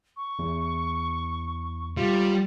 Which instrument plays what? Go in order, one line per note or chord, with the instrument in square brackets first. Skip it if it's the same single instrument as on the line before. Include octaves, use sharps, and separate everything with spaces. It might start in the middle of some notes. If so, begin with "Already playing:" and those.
[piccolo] C#6
[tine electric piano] E2
[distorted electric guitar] G3 [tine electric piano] F4